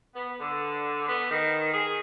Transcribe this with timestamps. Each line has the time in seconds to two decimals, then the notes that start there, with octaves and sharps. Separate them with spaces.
0.15 B3
0.39 D3
1.08 B3
1.31 D#3
1.73 G#4